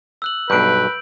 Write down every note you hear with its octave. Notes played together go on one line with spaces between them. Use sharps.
E6 F#6 F#7
B1 G2 B4 G6 D7